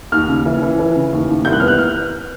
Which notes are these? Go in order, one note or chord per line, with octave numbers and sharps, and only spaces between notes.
D#2 F6
C#3
E3
E3
E3
C#3
D#2
D#2
C2 G6
F#6
B3 F6
F#6
F6